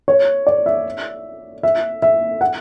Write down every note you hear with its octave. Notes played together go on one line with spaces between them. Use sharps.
C#5
D5
E5
E5
E5
F#5